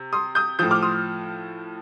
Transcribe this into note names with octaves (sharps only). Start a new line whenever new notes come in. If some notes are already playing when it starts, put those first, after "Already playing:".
Already playing: C3
C6 D#6
D#6 G6
A2 F3 D#6 G6
D6 F6
C6 D#6